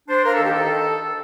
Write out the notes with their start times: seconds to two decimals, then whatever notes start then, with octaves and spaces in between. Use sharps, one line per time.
0.08 D4 C5
0.24 A#3 A#4
0.34 A4
0.40 D#3 G4
0.54 D#3 A4
0.71 D#3